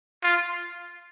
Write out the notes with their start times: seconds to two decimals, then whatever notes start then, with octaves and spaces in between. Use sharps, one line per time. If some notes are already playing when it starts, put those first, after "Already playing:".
0.24 F4